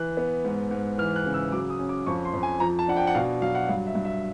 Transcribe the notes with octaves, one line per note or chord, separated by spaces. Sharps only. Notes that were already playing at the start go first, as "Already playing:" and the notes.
Already playing: E3 F#6
B3
G#2
G#2
E3 F6
F#6
C#3
E6
F#3 D6
D#6
C#4
D6
F2 C#6
C6
F2
G#5
F3 A#5
A5
D4 F#5
G5
F#5
B2 F5
F#3 F5
F#5
G2 F5
E5
G2
E5